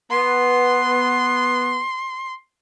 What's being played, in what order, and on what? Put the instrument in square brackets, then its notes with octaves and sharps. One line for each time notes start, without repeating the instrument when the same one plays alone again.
[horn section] B3 [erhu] C6